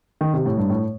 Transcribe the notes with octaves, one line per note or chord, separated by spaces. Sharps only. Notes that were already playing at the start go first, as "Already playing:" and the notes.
D#3
C3
A2
G2
A2